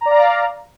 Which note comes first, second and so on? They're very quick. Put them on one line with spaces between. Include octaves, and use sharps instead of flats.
A#5 D5 F5